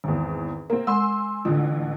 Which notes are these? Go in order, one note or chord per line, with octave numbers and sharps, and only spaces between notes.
G#1 E2
A#3 C4 A#4
G#3 G#5 C6 E6
A1 D3 F4